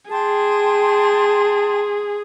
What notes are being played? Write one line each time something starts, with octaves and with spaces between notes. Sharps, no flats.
G#4 G5 A5 C6